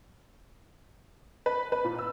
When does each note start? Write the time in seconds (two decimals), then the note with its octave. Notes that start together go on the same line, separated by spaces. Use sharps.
1.46 B4
1.72 B4
1.84 A#2
1.99 E6